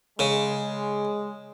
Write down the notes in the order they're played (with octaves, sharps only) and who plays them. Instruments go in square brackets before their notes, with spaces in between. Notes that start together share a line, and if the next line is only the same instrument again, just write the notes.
[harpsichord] C#3 [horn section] G#3